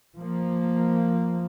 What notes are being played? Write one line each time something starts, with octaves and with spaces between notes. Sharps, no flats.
F3 A#3